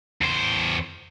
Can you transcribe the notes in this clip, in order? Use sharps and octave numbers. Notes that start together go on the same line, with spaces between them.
E2 C5